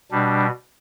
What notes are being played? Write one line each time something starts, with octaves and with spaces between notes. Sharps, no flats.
B2 G3 D4